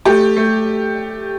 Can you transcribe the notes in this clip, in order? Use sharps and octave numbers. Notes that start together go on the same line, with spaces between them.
A3 G4
A3